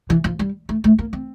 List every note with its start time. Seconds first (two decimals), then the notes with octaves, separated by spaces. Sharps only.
0.10 E3
0.24 F3
0.39 G3
0.69 A3
0.84 A3
0.99 A#3
1.13 C4